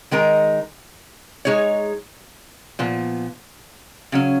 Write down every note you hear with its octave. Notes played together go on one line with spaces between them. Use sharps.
D#3 G#3 D#4 A#4
G#3 D#4 G#4 C#5
A#2 F3 B3
C#3 F#3 C#4